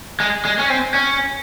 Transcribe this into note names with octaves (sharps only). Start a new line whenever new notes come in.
G#3
G#3
C#4
C4
C#4